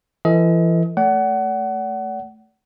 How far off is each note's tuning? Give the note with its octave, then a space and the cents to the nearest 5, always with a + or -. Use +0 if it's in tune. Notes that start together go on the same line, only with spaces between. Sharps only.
E3 +35 A4 +35 D#5 +35
A3 +0 D5 -40 F#5 +25